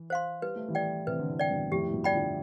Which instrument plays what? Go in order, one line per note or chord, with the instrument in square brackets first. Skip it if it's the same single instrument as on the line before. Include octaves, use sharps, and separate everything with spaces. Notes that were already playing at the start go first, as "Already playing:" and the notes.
Already playing: [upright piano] E3
[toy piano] C5 F5 C6
[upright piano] G3 [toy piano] B4
[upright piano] A3
E3 G3
[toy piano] D5 G5
[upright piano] C3 E3 [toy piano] B4
[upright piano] D3
A2 C3
[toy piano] D5 G5
[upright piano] G2 B2
[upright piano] F2 A2 [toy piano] G4
[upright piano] A2
G2 B2
[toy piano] D5 G5 B5
[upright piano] D3 F3